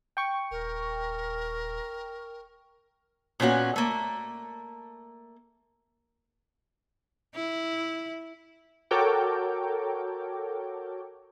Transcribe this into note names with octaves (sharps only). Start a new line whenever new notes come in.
G5 C#6
D#1 A#4
A#2 B3 C#4 F#4
A3 A#3
E4
F#4 A4 A#4 C#5 G5 D6